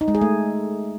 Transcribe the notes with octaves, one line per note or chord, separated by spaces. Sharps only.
D#4
G#3
G#4
A3